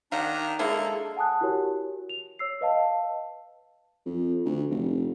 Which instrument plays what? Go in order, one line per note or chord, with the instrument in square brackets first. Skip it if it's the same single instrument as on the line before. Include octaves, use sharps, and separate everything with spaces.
[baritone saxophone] D#3 [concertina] D4 A#5 [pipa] F5 F#5
[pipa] D3 E4 [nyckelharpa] G#3 G#4 [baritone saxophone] A#3 [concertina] A4
[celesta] F#5 G#5 A5 D#6 F#6
E4 F#4 G4 A#4 C#5
F7
C#5 E6 C7
B4 D#5 F5 A5
[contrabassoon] F2
D2
F1